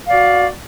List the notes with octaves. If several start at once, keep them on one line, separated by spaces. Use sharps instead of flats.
F#4 D5 F5